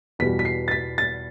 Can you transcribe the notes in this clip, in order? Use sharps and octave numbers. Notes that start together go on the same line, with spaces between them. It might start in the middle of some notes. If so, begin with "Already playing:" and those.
E2 B2 G3 B6
B6
C7
A6
B6
A6